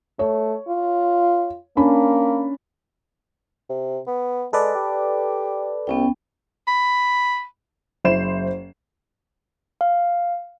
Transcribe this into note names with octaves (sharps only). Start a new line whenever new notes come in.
A3 C#5
F4
A#3 C#4 D4 B5
C3
B3
G#3 A4 B4 D5
G4
C2 B3 C#4 G5
B5
F#1 E4 C5 C7 E7
F5